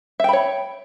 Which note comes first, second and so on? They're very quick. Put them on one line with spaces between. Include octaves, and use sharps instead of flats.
E5 G5 B5 C#5